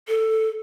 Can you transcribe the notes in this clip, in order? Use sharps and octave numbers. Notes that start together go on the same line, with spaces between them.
A4